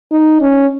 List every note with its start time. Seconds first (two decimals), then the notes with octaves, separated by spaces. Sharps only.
0.12 D#4
0.41 C#4